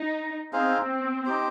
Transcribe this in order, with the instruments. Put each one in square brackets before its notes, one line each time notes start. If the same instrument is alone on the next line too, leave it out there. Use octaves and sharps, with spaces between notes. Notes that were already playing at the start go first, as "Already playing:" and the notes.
Already playing: [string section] D#4
[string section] C4 [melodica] D#4 G#4 C5 F5
[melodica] D#4 G4 C5